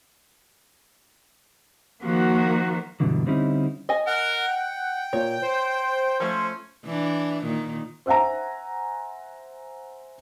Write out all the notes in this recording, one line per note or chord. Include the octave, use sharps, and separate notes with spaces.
D#3 F3 A#3 F#4
G2 B2 D3 E3 F#3
D3 G3 C4 C#4 D#4 E4
D#5 G#5
A#4 F#5
G5
A#2 C#5
C5
F3 A3 C#4
E3 D4
A#2 D#3
C5 E5 F#5 G#5 A#5